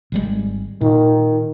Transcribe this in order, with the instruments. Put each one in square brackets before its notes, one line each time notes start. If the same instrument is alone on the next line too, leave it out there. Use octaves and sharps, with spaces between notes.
[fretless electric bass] G#1 G3 G#3
[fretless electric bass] A#2 [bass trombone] D#3